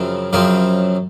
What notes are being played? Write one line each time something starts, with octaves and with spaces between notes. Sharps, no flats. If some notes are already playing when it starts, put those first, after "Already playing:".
Already playing: F#2 C#3 F3 C4
F#2 C#3 F3 C4 F4